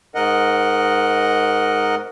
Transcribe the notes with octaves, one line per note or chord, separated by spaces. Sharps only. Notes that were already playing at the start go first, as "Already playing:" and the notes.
G#2 A#4 D#5 F#5